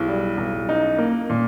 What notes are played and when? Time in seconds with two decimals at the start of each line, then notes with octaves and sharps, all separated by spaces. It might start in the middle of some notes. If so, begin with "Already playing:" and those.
Already playing: B1 E4 G4 G#4
0.08 G3
0.37 B1
0.69 C#4 D#4
0.98 A#3
1.30 A#2